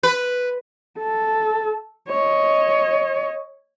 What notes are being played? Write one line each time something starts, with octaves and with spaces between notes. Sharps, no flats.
B4
A4
C#5 D#5